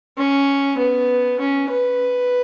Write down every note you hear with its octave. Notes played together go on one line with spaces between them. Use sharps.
C#4
B3
C#4
B4